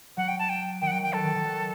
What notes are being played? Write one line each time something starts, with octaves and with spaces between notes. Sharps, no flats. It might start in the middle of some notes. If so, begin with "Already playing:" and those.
F#3 F#5
G5
A5
G5
D#3 G5
F#5
F#3 G5
F#3 G5
F#3 A4
D#3
D#3
F#3